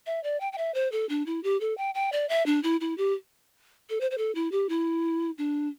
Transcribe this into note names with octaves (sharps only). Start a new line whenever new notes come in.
E5
D5
G5
G5
E5
C5
A4
D4
E4
G4
A4
G5
G5
D5
E5
D4
E4
E4
G4
A4
C5
C5
A4
E4
G4
E4
D4